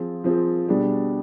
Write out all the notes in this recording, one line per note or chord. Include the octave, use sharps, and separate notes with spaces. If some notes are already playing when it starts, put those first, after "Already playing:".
Already playing: F3 C4 F4 G#4
F3 C4 F4 G#4
B2 G3 D4 G#4